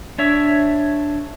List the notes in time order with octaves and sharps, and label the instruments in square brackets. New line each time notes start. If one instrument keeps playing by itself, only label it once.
[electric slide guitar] D4 C#5 E5